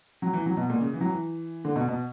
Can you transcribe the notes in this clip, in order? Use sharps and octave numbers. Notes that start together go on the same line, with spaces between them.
F#3
E3
F#3
B2
A#2
C#3
E3
F#3
E3
D3
B2
B2